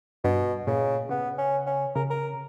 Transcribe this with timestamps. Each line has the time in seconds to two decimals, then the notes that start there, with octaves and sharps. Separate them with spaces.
0.24 G2 B2
0.67 A#2 C#3
1.09 C#3 B3
1.38 C#4
1.67 C#4
1.95 C#3 A#4
2.10 A#4